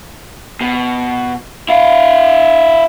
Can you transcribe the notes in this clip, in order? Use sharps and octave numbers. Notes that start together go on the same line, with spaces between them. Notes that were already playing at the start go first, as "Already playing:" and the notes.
B2
E4 F5